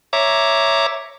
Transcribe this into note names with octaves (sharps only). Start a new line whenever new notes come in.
C#5 E5 A#5 D6